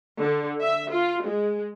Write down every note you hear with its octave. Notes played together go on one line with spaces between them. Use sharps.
D3
E5
F4
G#3